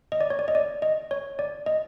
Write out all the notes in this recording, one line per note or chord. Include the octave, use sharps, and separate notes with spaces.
D#5
D5
C#5
D5
D#5
D5
D#5
C#5
D5
D#5